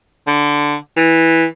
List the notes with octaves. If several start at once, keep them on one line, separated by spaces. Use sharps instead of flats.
D3
E3